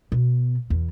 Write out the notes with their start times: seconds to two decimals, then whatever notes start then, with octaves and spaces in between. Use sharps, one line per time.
0.12 B2
0.70 E2